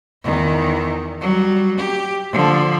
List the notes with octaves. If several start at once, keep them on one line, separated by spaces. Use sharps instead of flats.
E2 D#3
F#3 G3
G4
D3 F3